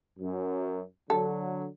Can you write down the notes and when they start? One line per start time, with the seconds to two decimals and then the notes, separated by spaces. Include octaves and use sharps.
0.19 F#2
1.10 D3 F#3 A4